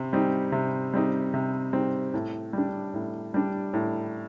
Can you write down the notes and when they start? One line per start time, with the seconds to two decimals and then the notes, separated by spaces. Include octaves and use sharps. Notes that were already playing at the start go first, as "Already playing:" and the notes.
Already playing: C3 C4
0.13 G3 C4 D#4
0.52 C3
0.94 G3 C4 D#4
1.34 C3
1.73 G3 C4 D#4
2.14 A2
2.53 G3 D4
2.94 A2
3.34 G3 D4
3.74 A2